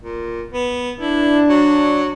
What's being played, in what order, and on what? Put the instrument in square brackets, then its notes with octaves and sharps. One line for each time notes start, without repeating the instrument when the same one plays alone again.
[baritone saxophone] A#2
B3
[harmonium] D4 [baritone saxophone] E4
[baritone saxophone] F#3